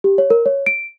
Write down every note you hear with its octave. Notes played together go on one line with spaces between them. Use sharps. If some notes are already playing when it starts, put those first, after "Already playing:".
G4
C#5
A#4
C#5
D7